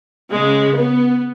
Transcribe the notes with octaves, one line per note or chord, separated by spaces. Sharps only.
C#3 G#3
B3